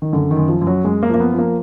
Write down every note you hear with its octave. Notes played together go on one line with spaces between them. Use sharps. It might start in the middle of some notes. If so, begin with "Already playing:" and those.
D#3
F#2 D3
D#3
F#2
F3
F#2
F#3
F#2 G#3
A#3
F3
A#3
B3
F3
A#3